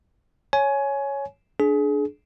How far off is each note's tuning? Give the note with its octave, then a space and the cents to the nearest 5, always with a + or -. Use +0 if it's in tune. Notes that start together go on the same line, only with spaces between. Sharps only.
C#5 +0 G#5 +20
D4 +0 G#4 +30